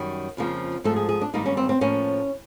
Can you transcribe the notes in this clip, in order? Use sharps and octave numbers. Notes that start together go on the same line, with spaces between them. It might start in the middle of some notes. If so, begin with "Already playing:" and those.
Already playing: F#2 D#3 G3
F2 C#3 F3 A#3
G#2 F3 A3 A4
G#4
G#4
D4
G#2 D#3 G3 A#3 D#4
C#4
C4
C4
A2 F3 A#3 C#4